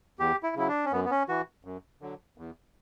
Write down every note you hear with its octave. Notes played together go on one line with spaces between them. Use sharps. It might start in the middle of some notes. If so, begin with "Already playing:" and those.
E2 G4
E4
C#3 F#3 E4
D4
C#4
F#2 B3
B3
C#4
E3 F#4
F#2
D3 F#3
E2